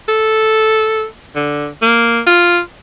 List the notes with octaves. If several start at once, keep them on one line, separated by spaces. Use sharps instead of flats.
A4
D3
A#3
F4